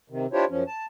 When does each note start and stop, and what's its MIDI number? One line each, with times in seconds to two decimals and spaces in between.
0.10 0.26 48
0.10 0.26 51
0.33 0.45 62
0.33 0.45 64
0.33 0.45 65
0.33 0.45 67
0.33 0.45 72
0.33 0.45 73
0.50 0.63 42
0.50 0.63 53
0.50 0.63 61
0.67 0.86 81